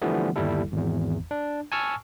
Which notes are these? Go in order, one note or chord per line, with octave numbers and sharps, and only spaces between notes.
D3 E3 F3 G3 A3 B3
G1 D#2 G3 E4 A4
G#1 E2
D4
G#5 A5 C#6 E6 F6